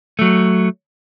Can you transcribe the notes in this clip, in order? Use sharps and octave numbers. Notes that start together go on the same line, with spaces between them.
F#3 A3